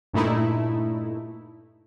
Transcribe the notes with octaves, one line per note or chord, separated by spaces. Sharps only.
G2 A#2 A3 D#4 E4